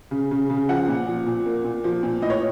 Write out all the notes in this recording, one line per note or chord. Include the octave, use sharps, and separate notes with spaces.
C#3
C#3
C#3
F3 F#5
A#2
F3
A#2
A#3
A#2
F3
A#2
A2 D#5
C#5